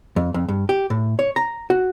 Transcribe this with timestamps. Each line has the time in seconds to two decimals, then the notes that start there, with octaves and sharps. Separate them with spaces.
0.16 F2
0.34 F2
0.48 G2
0.69 G4
0.90 A2
1.19 C#5
1.36 A#5
1.70 F#4